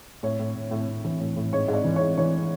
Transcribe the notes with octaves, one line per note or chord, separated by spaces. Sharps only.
A2 C#5
A2
A2
A2
A2
E3
A2
A2
G#2 C#5
G#2
D5
E3
G#2 C#5
E3 C#5